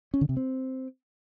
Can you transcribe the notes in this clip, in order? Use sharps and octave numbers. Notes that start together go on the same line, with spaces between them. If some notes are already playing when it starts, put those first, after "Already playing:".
C#4
D3
C3
C4